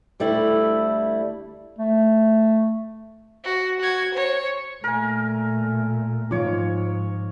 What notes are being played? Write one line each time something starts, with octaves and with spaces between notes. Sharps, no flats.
D2 G3 A3 E4
A3
F#4
F#4 G#6
C5 C#5
A#2 A3 A#4 G#5
G#2 F3 D#4 F4 C#5 D6